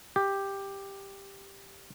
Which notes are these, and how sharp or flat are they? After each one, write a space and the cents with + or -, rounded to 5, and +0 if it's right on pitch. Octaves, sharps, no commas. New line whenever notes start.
G4 +5